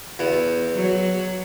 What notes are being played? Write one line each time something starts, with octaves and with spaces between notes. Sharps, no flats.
E2
F#3